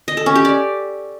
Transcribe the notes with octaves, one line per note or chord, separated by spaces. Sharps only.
D#5
A4
C#4
G4
D5